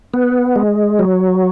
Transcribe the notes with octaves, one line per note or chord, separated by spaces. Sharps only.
B3
G#3
F#3